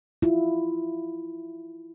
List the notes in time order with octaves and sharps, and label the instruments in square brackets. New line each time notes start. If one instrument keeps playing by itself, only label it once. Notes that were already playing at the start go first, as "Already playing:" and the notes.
[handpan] E4 F4